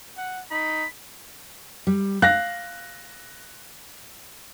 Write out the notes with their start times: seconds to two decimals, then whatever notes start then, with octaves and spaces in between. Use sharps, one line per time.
0.17 F#5
0.51 D#4 B5
1.87 G3
2.22 F5 F#6 A#6